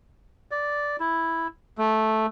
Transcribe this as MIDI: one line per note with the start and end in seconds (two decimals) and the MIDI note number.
0.51 0.96 74
1.00 1.47 64
1.78 2.26 57